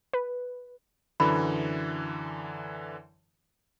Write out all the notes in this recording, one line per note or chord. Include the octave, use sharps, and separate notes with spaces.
B4
F#2 D3 E3 B5